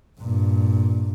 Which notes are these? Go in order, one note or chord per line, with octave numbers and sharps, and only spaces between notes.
G2 A#2